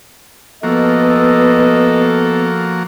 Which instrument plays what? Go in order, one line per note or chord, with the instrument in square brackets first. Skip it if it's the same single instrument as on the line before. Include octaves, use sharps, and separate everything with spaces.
[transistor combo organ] F3 A#3 F#4 [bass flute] B3 [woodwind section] A4 [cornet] D#5